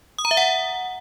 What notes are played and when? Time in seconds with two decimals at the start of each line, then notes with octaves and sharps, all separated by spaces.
0.19 D#6
0.25 A#5
0.31 E5
0.37 F#5